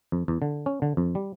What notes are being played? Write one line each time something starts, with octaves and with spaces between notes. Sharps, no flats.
F2
E2
D3
C#4
D3
F2
G3